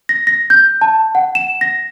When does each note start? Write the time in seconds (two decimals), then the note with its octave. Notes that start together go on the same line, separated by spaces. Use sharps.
0.09 A#6
0.27 A#6
0.50 G6
0.81 A5
1.15 F#5
1.35 E7
1.61 A#6